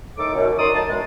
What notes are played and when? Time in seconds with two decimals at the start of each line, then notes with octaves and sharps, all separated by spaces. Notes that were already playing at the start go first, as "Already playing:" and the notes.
0.17 A2 D#3 D#4 A4 D6
0.34 F#2 B2
0.57 D#3 F#3 A#4 D5 C6 D#6
0.74 F#2 A2 D#4 A5
0.87 F#2 B2 D#3 G#3